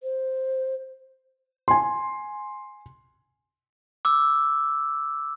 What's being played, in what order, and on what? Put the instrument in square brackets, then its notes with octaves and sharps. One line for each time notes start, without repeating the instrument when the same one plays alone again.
[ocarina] C5
[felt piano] G#5 C6
[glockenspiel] D6 E6